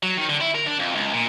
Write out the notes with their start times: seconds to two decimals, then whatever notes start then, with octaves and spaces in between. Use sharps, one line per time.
0.03 F#3
0.17 D#3
0.30 D3
0.41 E4
0.55 A#4
0.67 D4
0.80 F2
0.95 C#2
1.14 A#2